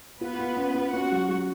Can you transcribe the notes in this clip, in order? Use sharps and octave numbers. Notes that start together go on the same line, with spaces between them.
B3 F4 B4
F4
C#4
F4
C#4 F#4 F#5
F#3
F#3